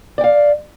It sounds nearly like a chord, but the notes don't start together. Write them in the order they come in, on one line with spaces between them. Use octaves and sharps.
D5 G5 F5